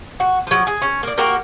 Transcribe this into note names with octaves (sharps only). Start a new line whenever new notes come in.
F#4
F3 F#3
G#4
C#4
A#3 D5
A#3 F#4 G4 A#4